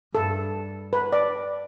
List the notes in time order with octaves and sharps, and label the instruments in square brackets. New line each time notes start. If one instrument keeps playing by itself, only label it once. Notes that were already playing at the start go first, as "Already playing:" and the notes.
[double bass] G2 [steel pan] A4
[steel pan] B4
D5